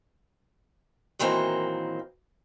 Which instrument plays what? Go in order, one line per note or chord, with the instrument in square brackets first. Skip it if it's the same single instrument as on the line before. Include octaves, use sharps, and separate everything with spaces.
[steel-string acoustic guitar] A#2 D#3 E3 F#3 A#3 C4